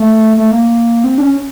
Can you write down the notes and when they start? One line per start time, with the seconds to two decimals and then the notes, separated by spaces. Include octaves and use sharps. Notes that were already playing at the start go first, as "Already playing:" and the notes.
Already playing: A3
0.37 A3
0.51 A#3
1.04 C4
1.18 D4
1.22 C#4